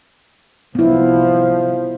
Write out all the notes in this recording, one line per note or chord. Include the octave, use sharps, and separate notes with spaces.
C2 F3 B3 E4